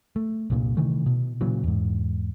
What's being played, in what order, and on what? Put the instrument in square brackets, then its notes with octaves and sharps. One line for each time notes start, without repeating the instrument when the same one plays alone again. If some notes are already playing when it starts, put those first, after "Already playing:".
[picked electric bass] A3
C2 G2 A#2
C3 D#3 E3 A3
B2
A#2 C#3 E3 F#3
E2 G#2